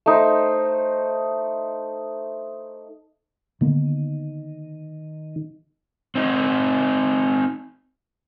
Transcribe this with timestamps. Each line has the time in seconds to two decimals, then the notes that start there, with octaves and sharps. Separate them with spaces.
0.06 A3 D#4 C5
3.61 D3 D#3 A#3 B3
6.15 C4 D#4